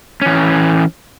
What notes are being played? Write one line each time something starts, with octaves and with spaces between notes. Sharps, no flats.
E3 C#4